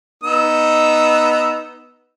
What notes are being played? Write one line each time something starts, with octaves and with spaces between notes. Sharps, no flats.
B3 D#4 E6